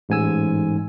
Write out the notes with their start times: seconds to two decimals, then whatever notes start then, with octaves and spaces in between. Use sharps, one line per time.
0.09 A1 G#2 G#5 E6